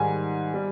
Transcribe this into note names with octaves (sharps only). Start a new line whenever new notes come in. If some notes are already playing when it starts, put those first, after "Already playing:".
Already playing: G#2 D#3 G3 G#5
G3